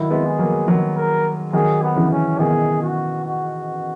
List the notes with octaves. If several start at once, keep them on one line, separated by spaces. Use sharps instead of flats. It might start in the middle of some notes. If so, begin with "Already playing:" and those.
Already playing: D#3 F#3 E4
G#3 B3
G#4
F#3 A#3
D#3 F#3
A#4
D#3 F#3 G#4
B3
C#3 E3
C#4
B2 D#3 G#4
F#4
F#4